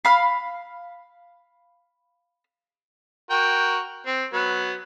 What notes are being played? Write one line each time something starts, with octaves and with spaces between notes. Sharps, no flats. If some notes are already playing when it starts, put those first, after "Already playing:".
F5 B5 F6
F#4 A#4 G5
C4
F#3 B3